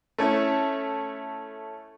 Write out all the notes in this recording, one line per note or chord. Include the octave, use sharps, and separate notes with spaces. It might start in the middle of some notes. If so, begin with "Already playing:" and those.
A3 C#4 E4